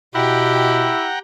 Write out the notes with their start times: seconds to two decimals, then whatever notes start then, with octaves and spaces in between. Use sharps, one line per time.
0.15 B2 E4 G4 F#5 G5 A#5